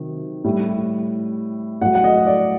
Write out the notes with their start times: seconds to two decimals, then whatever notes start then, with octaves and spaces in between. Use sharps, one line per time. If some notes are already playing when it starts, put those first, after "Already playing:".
Already playing: C3 D#3 F#3
0.44 A2 G3
1.81 A2 F#5
1.85 F#3
1.95 F#5
2.04 D#5
2.27 D5